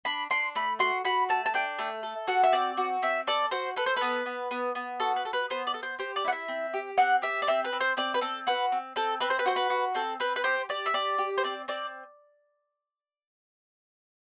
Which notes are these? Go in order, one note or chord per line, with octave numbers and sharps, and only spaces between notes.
D4 B5
D4 C6
A3 B5
F#4 C6
F#4 B5
A3 A5
A5
D4 G5
A3
A4
F#4 F#5
E5
C4 D5
F#4
C4 E5
A4 D5
F#4 C5
A4 B4
C5
B3 B4
B3
B3
B3
F#4 A4
B4
A4
B4
B3 C5
D5
A4
C5
G4 C5
D5
E4 F#5
E5
C4
G4
C4 F#5
G4 E5
D5
C4 E5
B4
C4
C5
C4 D5
B4
C4 A4
F#4 B4
C4
C4 A4
C4 B4
C5
B4
F#4 C5
B4
F#4
C4 A4
C4 B4
B4
G4 C5
G4 D5
E5
G4 D5
G4
C5
C4 D5
C4 D5